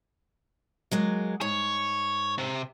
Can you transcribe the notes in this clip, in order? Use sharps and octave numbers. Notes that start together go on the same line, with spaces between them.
F#3 G#3 A#3
G#2 C#5
C3